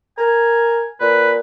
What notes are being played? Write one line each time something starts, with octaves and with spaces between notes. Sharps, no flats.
A#4 G#5
A#2 B4